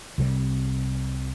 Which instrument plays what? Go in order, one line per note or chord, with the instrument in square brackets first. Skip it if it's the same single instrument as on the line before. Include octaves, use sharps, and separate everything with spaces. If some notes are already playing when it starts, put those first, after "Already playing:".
[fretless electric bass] C2 C3 G3